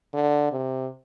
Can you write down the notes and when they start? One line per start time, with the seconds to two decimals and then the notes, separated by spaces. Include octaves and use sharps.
0.14 D3
0.52 C3